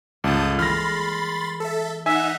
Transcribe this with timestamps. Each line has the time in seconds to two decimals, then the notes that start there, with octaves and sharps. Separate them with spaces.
0.24 G1 C#2 D5 A5 D#6 G6
0.59 E3 G#3 A#3 B5 C6 F6 A6 A#6
1.60 A4 E5
2.06 D#4 E5 F#5 G#5